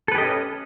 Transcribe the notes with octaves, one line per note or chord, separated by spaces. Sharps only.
C#4 G4 A4 B4 D#5